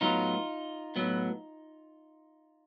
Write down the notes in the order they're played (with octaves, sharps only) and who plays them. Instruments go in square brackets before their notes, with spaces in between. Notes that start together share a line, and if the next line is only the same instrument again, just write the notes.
[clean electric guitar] A2 F#3 B3 D#4 F4
A2 F#3 B3